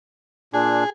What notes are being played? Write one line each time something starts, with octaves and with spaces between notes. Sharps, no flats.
A#2 D4 G#4